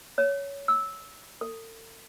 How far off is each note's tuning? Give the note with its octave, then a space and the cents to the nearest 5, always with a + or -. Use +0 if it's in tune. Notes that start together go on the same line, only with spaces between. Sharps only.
C#5 +15
E6 -15
A4 +40